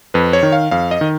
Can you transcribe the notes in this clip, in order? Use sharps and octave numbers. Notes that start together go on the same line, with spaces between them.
F2 B4
C#5
D#3
F5
F2 F5
D#5
D#3